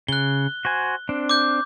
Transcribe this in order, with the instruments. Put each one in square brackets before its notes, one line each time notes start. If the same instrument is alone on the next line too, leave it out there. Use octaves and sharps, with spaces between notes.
[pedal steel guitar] C#3 [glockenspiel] F#6 G7
[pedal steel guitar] F#4 C5 G#5
C4 D4
[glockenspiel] D6 G6